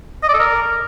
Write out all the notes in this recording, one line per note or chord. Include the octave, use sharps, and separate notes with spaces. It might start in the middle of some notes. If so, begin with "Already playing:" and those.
D#5
D5
A4
A#4